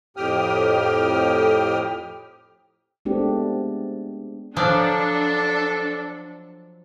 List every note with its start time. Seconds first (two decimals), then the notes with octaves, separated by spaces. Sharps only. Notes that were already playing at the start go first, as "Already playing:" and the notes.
0.17 F2 A2 G4 G5 D#6 F6
3.05 G#3 A3 B3 C4 D4 G4
4.57 F3 F#3 D4 A4 D5